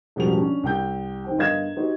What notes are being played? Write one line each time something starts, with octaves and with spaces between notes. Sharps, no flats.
E1 A1 F3 G3 F#4 F7
C#4 D4
C2 G5 G6
D#3 C4 G5
G1 A#4 D#5 F5 G#6 E7
D#4 F#4 G4 C5